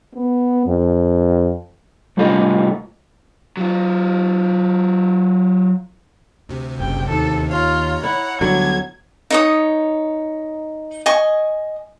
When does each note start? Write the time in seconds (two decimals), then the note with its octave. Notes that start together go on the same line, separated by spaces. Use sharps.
0.15 B3
0.67 F2
2.17 C2 G3 A3 F4 A4 D#5
3.57 F#3 F4
6.49 D2 C3
6.80 F#1 G5
7.09 D#2 D#3 A4
7.51 F4 C#5 A#5
8.03 E4 F#5
8.41 D2 D3 F#3 G3 B3 G#6
9.31 D#4 C#5 D#6
11.06 D#5 G#5 C#6